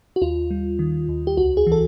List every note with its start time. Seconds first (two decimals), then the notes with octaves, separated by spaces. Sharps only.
0.16 F#4
0.22 D#2 F4
0.51 G3
0.79 D#3
1.09 D#2
1.27 G4
1.37 C#2 F#4
1.57 G#4
1.67 E3
1.72 A4